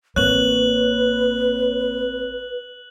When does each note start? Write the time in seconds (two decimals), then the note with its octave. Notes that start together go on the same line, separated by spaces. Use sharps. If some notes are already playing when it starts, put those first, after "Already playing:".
0.16 A1 A#3 C4 B4 C#5 F#6 F#7